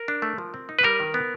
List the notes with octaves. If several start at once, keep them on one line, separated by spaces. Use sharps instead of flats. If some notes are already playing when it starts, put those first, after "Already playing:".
Already playing: A#4
D4
A3
F3
C4
D#4
B4
G3 A#4
D#3
B3